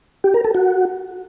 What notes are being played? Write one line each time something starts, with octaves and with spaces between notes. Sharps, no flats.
G4
A#4
A4
F#4